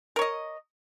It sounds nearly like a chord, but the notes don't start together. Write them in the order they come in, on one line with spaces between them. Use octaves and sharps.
A#4 C#5 D#5